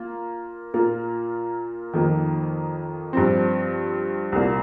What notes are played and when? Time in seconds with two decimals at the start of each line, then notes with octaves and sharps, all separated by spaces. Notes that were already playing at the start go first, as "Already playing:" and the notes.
Already playing: A#3 F4
0.74 A#2 A#3 F4
1.93 F2 D#3 A#3
3.13 G2 F3 C4
4.32 C2 A#2 A#3